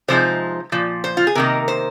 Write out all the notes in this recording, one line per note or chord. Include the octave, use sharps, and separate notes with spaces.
C3 F3 G#3 D#4 C5
A#2 F3
C5
F4
G#4
C3 D#3 A#3 A#4
C5